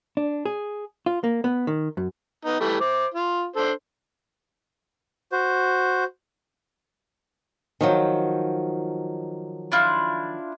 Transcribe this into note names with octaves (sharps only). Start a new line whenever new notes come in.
D4
G#4
F4
A#3
B3
D#3
F#2
B3 D#4
E3 G3 A3
C5 D6
F4
D4 A4 C5
F#4 C5
D#3 F3 F#3
D4 E4 F4